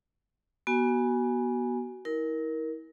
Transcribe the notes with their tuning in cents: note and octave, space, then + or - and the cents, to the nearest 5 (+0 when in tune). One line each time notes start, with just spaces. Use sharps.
B3 -30 F#4 +20 G#5 +0
E4 -40 A#4 +10